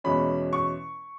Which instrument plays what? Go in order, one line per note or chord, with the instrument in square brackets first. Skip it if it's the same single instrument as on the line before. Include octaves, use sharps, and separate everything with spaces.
[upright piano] E2 B2 G#3 C#4 B5
C#6